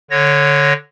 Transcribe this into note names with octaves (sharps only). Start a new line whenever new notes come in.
D3 C#5 A#6